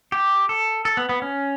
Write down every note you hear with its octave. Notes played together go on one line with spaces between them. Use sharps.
G4
A4
A4
B3
B3
C#4